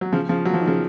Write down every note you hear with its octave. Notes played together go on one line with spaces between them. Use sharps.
F#3
C#3 F3
C#3 F3
F#3
F3
D#3
C#3 F3